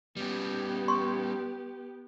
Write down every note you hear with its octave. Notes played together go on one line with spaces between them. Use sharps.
G3 B3 C#4 G4
C6 C#6